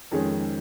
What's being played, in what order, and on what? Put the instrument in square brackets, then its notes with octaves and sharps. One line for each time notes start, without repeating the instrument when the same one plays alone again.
[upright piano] F2 D#3 G#3 C#4 G#4